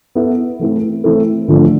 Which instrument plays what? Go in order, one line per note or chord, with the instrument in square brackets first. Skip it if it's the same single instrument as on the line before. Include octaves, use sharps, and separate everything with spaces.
[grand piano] B3 E4 A4 E5
E3 A3 C4 E4 A4
E3 A3 C4 E4 A4
D3 F3 A3 D4